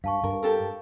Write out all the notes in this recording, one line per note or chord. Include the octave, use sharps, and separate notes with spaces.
G2 F5 A5 C#6
G2 A#4
G4 A4 A#4